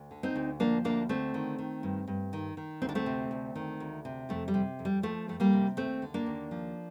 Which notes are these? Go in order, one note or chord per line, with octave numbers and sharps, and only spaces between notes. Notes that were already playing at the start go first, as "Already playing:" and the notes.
Already playing: D2
D3
C4 D#4
D2
F3 A#3 D4
D2 A#3 D4
D3 A3 C4
D#3
D#3
G2
G2
D#3
D#3
D2 C4
D4
A3 C4
C3
D2
D#3
D2
C3
F2 A3
G3
C3
F2
G3
F3 A3
F2 A3
G3 A#3
C3
D#2 A3 C4
D3
A#3 D4
D#2
F3